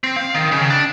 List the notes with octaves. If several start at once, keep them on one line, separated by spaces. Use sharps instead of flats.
C4
F5
D#3
C#3
D4